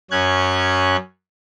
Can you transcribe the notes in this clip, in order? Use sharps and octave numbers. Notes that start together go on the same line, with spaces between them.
F#2 C#4 F#6 G#6